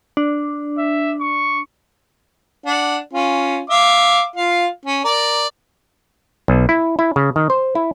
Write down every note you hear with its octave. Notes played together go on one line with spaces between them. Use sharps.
D4
E5
C#6
D4 F#5
C#4 F4
E5 F5 D6
F4 F5
C#4
A#4 D5
B1
E4
E4
C#3
D#3
C5
E4